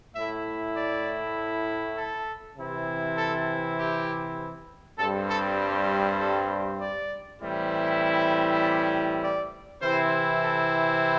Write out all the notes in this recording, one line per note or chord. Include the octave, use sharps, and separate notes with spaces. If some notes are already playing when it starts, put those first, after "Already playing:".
A2 A3 E4 E5
D5
A4
C3 E3 C4 E4
A4
G4
G2 G3 C4 A4
A4
G4
A4
D5
A2 E3 G3 C4 E4
E5
D5
D5
C3 E3 C4 E4 C5
A4